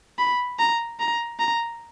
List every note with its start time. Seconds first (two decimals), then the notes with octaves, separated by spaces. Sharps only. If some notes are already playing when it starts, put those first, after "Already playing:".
0.19 B5
0.60 A#5
1.00 A#5
1.40 A#5